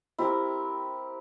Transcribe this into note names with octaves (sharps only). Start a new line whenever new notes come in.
C4 E4 G4 A#4